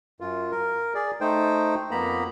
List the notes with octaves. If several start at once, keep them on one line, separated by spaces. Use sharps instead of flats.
F#2 F4
A#4
G#4 D5
A3 D#4 C5 G5
F2 A#3 B3 A#5 B5